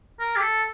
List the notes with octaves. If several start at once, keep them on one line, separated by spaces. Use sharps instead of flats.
A#4
G4
A4